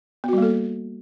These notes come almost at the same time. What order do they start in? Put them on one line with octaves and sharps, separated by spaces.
B3 F#4 G3 A#3 A4